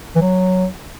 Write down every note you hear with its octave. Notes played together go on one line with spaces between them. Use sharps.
E3
F#3